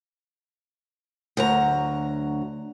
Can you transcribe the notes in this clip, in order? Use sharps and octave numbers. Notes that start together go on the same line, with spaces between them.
D2 F#3 A#5